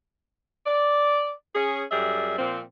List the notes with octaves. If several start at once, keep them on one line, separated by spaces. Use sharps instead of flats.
D5
C#4 G#4
F#2 G3 G#4 D5 E5
A#2 F3 C4